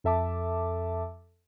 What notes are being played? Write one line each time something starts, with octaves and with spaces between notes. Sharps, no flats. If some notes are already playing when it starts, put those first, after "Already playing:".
F2 A4 E5 A5 D6